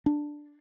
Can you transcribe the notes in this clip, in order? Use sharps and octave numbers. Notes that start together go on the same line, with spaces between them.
D4